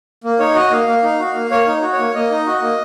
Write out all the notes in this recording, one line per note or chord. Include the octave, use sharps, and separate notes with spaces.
A#3
D#4 C#5
F#4 D#5
A#3 F5
A#3
D#4
F#4
A#3
A#3 C#5
D#4
F#4
C#5
A#3
A#3 D#5
D#4
F#4
A#3